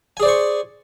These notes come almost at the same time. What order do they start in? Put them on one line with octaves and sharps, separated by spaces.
G#5 G#4 D5 C5 C#6